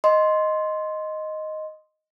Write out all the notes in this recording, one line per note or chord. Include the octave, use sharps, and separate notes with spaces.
D#5 C6